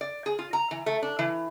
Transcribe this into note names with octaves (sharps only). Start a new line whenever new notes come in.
D5
G#4
F4
A#5
E3
A3
D4
E3